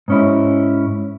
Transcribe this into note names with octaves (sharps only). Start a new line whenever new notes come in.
G#2 C#4 E4